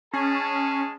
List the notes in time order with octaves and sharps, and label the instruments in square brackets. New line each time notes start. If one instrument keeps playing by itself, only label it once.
[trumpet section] G#3 G#4 A5 [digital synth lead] C#4